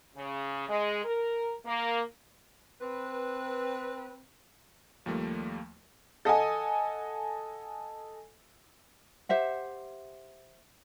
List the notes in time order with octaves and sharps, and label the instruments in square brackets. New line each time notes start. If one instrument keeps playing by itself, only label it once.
[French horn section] C#3
G#3
A#4
A#3
[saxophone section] C4 B4
[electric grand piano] D#2 F3 G3 A3 A#3
[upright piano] A4 D#5 F#5 G#5
[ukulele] G4 C5 E5 F#5